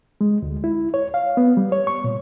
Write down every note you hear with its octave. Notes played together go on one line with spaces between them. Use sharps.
G#3
D2
E4
C#5
F5
B3
G3
C#5
C#6
A#2